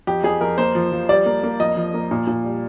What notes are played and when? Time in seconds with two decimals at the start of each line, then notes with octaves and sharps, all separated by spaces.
0.07 F2 G4
0.24 F2 G#4
0.41 F2 A#4
0.58 A#3 C5
0.75 F3
0.92 F3
1.09 G3 D5
1.26 A#3
1.43 A#3
1.60 F2 D#5
1.77 F3
1.94 A#3
2.11 A#2
2.27 A#2
2.44 G3